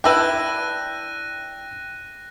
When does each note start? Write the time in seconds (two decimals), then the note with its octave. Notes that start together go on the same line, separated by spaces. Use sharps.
0.04 D4 E4 B4 G5 E6 F#6 A#6 D#7